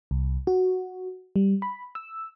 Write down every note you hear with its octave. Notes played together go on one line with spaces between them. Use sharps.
C2
F#4
G3
B5
E6